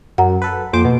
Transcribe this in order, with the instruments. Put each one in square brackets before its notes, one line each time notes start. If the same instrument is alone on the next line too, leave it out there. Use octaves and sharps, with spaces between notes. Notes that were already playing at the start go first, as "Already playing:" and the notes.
[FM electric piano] F#2 [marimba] F#5 A#5
[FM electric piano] A4 B4
[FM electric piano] F2 C5 D6 [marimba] A#3
[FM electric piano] B2